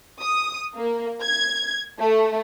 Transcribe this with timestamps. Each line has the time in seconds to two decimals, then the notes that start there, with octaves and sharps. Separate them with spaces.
0.21 D#6
0.76 A#3
1.22 G#6
2.00 A3